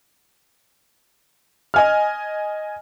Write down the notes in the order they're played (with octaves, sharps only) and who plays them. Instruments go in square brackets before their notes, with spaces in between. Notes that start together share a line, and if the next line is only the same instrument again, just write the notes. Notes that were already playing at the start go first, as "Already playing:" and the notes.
[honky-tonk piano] D#5 G#5 F6